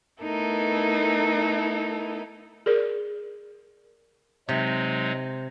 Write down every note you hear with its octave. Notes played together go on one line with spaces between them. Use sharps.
A3 B3 D#4 E4 A4 A#4
G#4 A#4 D5
C3 F#3 G#3 D#4